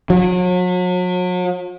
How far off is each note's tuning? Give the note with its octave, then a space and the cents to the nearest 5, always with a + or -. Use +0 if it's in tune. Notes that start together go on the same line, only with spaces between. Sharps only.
F#3 -40